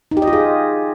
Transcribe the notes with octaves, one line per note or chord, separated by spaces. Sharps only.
D#4
G4
D#5
F4
G#4